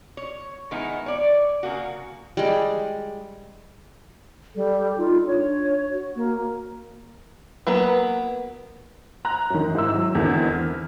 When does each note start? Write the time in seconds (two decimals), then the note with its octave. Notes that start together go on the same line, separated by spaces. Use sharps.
0.17 C#5
0.71 D#3 G#3 B3 D#4 E4
1.06 C#5 D5
1.63 C#3 A#3 F#4
2.37 G3 G#3
4.55 G3 A4
4.98 D#4 F4
5.27 D4 C#5
5.91 F#4
6.16 A#3
7.67 F#3 A#3 B3 B4
9.25 A#5 F#6
9.50 F#2 D#3
9.75 G#2 E4 E6
9.95 E3 F#3
10.15 E2 D3 D#3 C4
10.53 F6